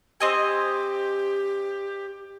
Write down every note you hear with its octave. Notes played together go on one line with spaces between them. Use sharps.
C4 G4 D#5 G#5